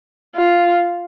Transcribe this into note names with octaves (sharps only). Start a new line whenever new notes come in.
F4